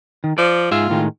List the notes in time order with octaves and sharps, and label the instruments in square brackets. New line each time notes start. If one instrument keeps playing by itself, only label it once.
[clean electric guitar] D#3
[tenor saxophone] F3 [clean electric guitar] D5
[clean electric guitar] G#2 G#4 E5 [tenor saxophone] F4
[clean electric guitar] A2 D#3 G#3